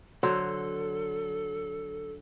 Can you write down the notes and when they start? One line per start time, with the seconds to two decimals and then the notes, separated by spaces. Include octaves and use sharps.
0.23 D3 F#3 A4 C5